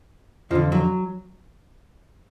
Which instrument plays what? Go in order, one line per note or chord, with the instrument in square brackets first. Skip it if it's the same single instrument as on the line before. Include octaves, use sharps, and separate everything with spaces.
[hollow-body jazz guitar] F2 F3
D3
F#3